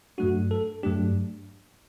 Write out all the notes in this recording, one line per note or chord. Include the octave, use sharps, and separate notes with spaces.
G2 F#3 A3 D4 F#4
A4
G2 F#3 A3 D4 G4